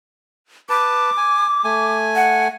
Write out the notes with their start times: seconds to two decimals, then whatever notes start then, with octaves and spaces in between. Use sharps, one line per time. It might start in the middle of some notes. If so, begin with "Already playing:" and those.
0.69 B4 A5 D6
1.17 G#5
1.64 A3 G#5
2.16 F#5